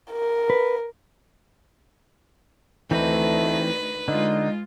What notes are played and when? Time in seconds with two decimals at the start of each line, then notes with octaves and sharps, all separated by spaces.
0.12 A#4
0.50 B4
2.91 D2 D#3 E3 A3 C4 D#4 B4
4.08 D3 G#3 D#4 F4